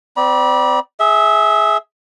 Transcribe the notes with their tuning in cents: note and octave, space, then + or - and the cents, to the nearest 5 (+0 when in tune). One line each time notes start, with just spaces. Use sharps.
C4 -30 D5 +0 B5 -40
G#4 +10 E5 -15